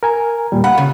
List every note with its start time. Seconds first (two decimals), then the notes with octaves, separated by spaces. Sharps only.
0.03 A#4 G#5 A#5
0.52 D#2 A#2 G3
0.64 F5 F#5 B5
0.78 C#3